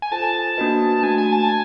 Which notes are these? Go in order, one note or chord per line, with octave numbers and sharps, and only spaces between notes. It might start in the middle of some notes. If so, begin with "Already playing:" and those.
G#5
F4 A4 C5 A5
A#3 D4 F#4 B4 D#5
A3 D4 F#4 G#5
G#5
A5
G#5 A5